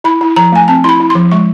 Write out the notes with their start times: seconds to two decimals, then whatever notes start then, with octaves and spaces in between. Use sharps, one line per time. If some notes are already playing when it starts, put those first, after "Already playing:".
0.04 E4 B5
0.21 E4
0.36 F3 A#5
0.52 A3 G#5
0.68 C4 A5
0.84 E4 B5 C6
1.00 E4
1.10 C6
1.15 F3
1.31 G#3 C#6